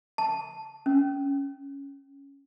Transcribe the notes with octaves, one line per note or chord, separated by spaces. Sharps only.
A5
C#4